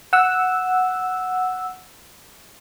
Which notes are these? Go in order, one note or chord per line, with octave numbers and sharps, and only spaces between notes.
F#5 E6